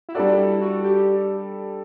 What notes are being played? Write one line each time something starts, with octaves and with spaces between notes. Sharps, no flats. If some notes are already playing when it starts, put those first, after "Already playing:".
E4
G3 D4 F#4 A4 D5
E4
F#4
G4